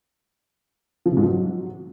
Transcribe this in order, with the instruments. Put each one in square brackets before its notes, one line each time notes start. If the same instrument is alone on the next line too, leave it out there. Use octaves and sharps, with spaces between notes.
[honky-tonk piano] F3
C3
G#2
F3
F#3